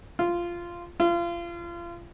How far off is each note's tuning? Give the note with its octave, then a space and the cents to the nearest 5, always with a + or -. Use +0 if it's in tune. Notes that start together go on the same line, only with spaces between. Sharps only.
F4 -10
F4 -30